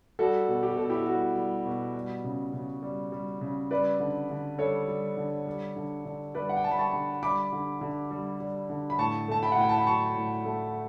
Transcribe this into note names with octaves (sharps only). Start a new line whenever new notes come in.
G3 F#4 A4
B2
G4
B2 A4
E4 G4
G3 F#4
G3
B2
G3
C#3
C#3
G3
G3
C#3
G3 B4 D5
D3
D3
G3 A4 C#5
G3
D3
G3
D3
D3
G3 B4 D5
F#5
G5
G3 A5
B5
A5 C#6
D3
G3 B5 D6
D3
D3
G3
G3
D3
B5
A2 A5 C#6
A3 A5
G5 B5
F#5
A2 G5
A5
B5
F#3 A5 C#6
A2
A3